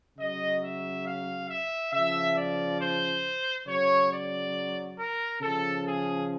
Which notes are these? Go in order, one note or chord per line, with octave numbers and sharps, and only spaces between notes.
C#3 F#3 D#5
E5
F5
E5
C#3 F3 E5
D5
C5
C#3 F#3 C#5
D5
A#4
C#3 F3 A4
G#4